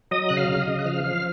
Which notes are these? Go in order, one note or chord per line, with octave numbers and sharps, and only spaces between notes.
F#3 D#5 D#6
C#3 F#6
F5 F6
C#3
D#5 D#6
C#3
F#6
F3 F5 F6
F3 F5 F6